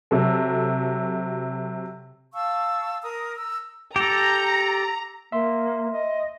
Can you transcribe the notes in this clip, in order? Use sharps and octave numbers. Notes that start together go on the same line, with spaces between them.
C3 F#3 A4
F5 A5 C#6 E6
A#4 A#5 D#6
A#5 E6
G4 A4 A#5
A#3 E5 C6
D#5